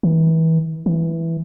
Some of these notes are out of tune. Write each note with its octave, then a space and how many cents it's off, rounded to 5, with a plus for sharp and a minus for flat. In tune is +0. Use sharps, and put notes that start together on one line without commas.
E3 -30
E3 +0